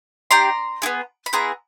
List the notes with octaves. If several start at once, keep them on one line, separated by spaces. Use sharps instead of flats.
D4 G4 A#5 C6
B3 E4 G#4
B5
B3 E4 G#4 A#5 C6